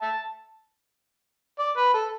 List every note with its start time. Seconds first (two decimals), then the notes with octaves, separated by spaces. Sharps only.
0.02 E5 A5
1.59 D5
1.77 B4
1.94 A4